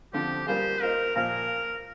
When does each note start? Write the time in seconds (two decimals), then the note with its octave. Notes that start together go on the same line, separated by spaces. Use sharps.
0.13 D3 F3 C4 G4
0.47 G3 A#3 F4 G#4 C5
0.81 A#3 F4 A#4 C5 D#5
1.15 A#2 F3 A#3 F4 A#4